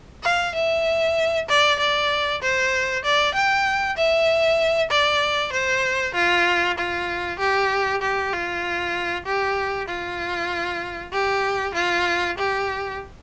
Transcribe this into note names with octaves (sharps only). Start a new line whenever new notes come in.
F5
E5
D5
D5
C5
D5
G5
E5
D5
C5
F4
F4
G4
G4
F4
G4
F4
G4
F4
G4